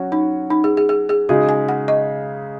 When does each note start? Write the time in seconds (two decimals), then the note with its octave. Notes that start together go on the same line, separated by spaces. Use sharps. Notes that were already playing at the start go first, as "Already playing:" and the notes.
Already playing: F#3 C#4 F#4 C#5
0.12 D#4
0.50 D#4
0.64 G#4
0.77 G#4
0.89 G#4
1.09 G#4
1.29 C#3 G#3 D#4 F#4 G#4
1.49 G#5
1.69 F#5
1.88 D#5